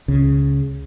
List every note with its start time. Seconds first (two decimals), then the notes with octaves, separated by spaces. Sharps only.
0.08 C#2 C#3